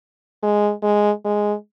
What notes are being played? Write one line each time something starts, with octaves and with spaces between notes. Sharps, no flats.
G#3
G#3
G#3